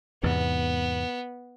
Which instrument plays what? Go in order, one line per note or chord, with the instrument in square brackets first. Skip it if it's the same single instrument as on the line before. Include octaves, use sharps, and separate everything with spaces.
[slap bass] E2 G#2 C3 [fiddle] B3